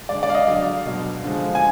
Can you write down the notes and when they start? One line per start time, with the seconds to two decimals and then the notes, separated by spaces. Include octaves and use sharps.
0.09 D3 G#3 D5
0.23 D5
0.30 F5
0.35 D#5
0.48 D3 F#3 F5
0.86 B2 F#3
1.24 D3 F3 G#3
1.55 G#5